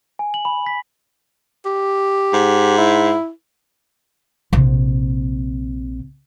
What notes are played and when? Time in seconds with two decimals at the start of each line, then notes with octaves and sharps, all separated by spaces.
0.19 G#5
0.34 F#7
0.45 B5
0.67 B6
1.66 G4
2.33 G#2
2.78 E4
4.53 A#1 C3